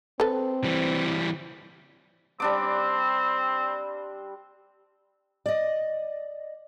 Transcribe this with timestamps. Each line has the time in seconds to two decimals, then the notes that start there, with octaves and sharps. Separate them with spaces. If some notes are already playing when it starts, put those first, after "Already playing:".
0.20 C4 A4 B4
0.64 E3 G3
2.40 G3 C4 D4 D6
5.46 D5 D#5